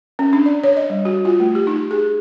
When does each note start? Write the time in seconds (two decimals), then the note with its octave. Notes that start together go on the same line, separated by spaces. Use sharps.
0.19 C#4
0.33 D4
0.46 D5
0.64 C#5
0.77 D#5
0.90 G3
1.05 F#4
1.25 F4
1.40 A3
1.55 G4
1.67 D#4
1.91 G#4